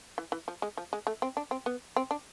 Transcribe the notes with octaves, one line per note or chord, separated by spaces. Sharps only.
E3
E3
F3
G#3
F3
G#3
A3
C4
D4
C4
B3
C4
D4